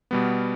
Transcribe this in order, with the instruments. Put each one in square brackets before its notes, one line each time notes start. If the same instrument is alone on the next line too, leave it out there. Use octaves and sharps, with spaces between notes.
[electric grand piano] B2 G3 B3